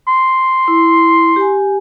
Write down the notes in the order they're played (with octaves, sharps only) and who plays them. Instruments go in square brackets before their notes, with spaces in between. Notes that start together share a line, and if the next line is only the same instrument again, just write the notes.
[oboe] C6
[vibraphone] E4
G4 G#5